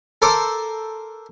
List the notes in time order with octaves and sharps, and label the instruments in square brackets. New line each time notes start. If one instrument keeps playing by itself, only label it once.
[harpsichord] A4 A#4 C5 C6 D6